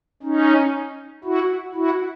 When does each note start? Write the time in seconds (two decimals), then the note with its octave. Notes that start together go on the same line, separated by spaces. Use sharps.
0.22 C#4 D#4
1.24 E4 F#4
1.74 E4 F#4